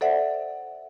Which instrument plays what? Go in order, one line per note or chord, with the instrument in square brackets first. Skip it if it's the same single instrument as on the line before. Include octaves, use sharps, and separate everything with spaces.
[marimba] A4 C5 D5 E5 F#5